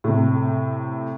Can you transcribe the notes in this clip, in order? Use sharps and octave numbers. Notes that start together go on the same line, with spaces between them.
A2 C3